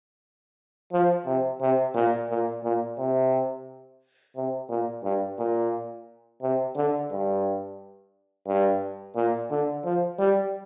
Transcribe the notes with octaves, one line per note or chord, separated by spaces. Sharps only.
F3
C3
C3
A#2
A#2
A#2
C3
C3
A#2
G2
A#2
C3
D3
G2
G2
A#2
D3
F3
G3